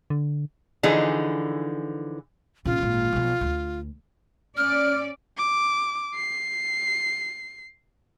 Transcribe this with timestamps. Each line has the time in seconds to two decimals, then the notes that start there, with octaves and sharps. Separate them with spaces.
0.10 D3
0.83 D3 E3 F3 D#4 G#4
2.65 A#1 C#3 F4
2.78 G#1 A#2
3.13 B1 F3
3.41 D2
4.57 C#4 D5 F6
5.38 D6
6.15 C7